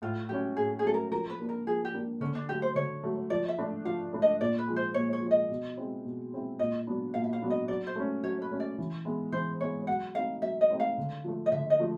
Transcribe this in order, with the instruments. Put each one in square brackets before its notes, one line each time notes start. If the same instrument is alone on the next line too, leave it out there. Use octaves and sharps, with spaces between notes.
[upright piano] A2 [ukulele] F4
[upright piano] F#3 A3 C#4 [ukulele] G4
[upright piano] A2 [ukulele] G#4
[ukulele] G#4
[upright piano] F#3 A3 C#4 [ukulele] A4
[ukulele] A#4
[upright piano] F3 [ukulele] A#4
[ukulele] B4
[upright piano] A#3 D4
[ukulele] A#4
[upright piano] F3 [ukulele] G#4
[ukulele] G4
[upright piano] A#3 D4
[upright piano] D3 [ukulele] C#4
[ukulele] D4
[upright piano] F#3 A3 [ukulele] G4
[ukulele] C5
[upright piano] D3 [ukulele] C#5
[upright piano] F#3 A3
[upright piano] F3 [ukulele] D5
[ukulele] E5
[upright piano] A3 D4
[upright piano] F3 [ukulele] F5
[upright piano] A3 D4
[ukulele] D#5
[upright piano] A#2 [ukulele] D5
[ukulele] B4
[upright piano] F3 G#3
[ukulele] C5
[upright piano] A#2 [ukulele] C#5
[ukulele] C#5
[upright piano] F3
[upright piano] G#3 [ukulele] D#5
[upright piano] B2
G#3 C4 E4
B2
G#3 C4 E4
[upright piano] A#2 [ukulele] D#5
[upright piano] F#3 B3 D4
[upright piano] A#2 [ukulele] F5
[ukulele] E5
F5
[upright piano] F#3 B3 D4
[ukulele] D#5
[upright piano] F#3 [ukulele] D5
[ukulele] C5
[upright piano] A3 C#4
[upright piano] F#3 [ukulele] C#5
[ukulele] B4
[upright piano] A3 C#4
[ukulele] D5
[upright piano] E3
G#3 B3 E4
[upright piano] E3 [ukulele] C5
[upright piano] G#3 B3 E4 [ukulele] C#5
[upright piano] F#3 [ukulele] F#5
[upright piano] A3 C4 D#4 [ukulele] F5
[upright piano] F#3 [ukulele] E5
[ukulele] D#5
[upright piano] A3 C4 D#4
[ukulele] F5
[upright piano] D3
F3 A3
[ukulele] D#5
[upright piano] D3 [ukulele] E5
[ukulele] D#5
[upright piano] F3 A3